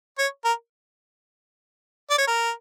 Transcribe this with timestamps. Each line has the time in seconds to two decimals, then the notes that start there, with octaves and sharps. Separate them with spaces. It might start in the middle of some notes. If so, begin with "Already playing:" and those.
0.19 C#5
0.44 A#4
2.10 D5
2.18 C#5
2.27 A#4